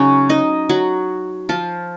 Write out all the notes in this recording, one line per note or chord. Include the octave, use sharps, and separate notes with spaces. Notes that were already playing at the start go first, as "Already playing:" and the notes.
Already playing: C#3 F#3 C#4 D#4 F#4 C#5
D#4 D#5
F#3 F#4
F3 F4